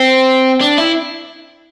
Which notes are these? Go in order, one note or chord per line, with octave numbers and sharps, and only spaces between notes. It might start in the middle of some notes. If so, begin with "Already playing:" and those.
Already playing: C4
D4
E4